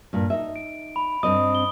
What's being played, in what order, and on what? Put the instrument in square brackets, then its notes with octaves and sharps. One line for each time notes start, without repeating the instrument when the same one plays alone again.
[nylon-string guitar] G2 A#2
D#4 E5
[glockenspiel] D7
B5
[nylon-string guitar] G2 C4 D#5 [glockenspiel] D#6
[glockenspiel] G7